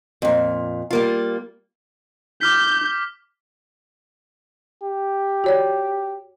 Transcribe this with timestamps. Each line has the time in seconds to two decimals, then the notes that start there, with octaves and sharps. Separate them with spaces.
0.22 F2 A#2
0.91 G3 A#3 F4
2.41 D6 F6 G6 B6
4.83 G4
5.44 F#4 C#5 D5